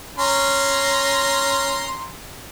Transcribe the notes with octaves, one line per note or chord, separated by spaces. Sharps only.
C#4 A#5 C6